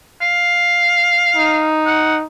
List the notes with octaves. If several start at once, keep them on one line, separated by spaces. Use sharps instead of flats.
F5
D#4
F#5